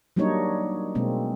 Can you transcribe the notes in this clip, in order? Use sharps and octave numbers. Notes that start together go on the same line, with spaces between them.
F#3 G3 A#3 D4 D#4 C#5
B2 G#3 A#3 C4